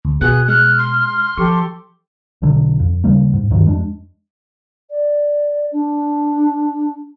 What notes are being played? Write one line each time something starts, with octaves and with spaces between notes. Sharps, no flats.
D2
B2 B3 F#4 G#4 F#6
G#3 F6 F#6
C6
F3 G4 A4 C#6 D6
B1 B2 D3 F#3
F2
D#2 C#3 G3 A#3
G#2
D2 G2 D#3 F#3
F2 G#3 C#4 D4
D5
D4